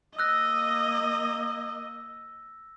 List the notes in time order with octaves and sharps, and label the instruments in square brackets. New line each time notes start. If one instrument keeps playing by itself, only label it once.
[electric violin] A#3 D#5 [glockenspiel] E6 F#6 A#6